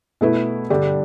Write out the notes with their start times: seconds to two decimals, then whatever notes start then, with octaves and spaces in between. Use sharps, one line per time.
0.21 B2 A3 E4 B4
0.70 G2 D3 G3 D4 G4